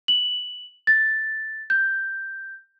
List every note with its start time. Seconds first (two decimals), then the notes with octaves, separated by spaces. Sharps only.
0.08 F#7
0.87 A6
1.70 G6